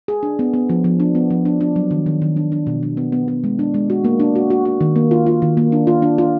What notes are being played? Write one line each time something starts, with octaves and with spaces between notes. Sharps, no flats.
G#4
D4
B3
B3
F3
F3
D4
B3
F3
D4
D4
F#3
D#3
D#3
D#3
D4
D4
B2
D4
B3
B3
B3
G#3
D4
G#3
F#4
A#3
D4
F#4
F#4
F#4
D#3
A#3
F4
F4
D#3
A#3
D4
F4
D4
F4